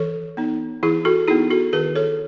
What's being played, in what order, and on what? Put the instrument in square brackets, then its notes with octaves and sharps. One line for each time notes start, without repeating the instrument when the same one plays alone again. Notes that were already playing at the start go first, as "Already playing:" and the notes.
Already playing: [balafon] E3 A4 C#5
B3 D#4
E3 E4 G#4
F#4 A4
B3 D#4 E4 G#4
F#4 A4
D#3 G#4 B4
A4 C#5